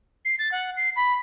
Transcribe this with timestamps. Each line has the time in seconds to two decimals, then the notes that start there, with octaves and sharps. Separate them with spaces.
0.25 C7
0.39 A6
0.52 F#5
0.77 C7
0.96 B5